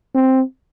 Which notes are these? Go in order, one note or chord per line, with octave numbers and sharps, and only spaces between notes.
C4